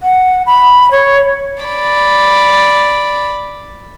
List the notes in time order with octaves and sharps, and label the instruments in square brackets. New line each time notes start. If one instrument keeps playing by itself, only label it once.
[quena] F#5
B5
C#5
[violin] D5 B5